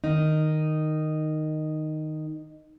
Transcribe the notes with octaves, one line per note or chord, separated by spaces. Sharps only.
D#3 D#4